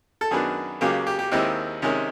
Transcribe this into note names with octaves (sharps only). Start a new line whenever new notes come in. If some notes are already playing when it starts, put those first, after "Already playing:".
A4
F#2 D#3 F#3 B3 D4 G#4
C#2 C#3 F#3 A#3 G4
G4
G4
D#2 D#3 G#3 C4 E4 G4
C3 D#3 G#3 C#4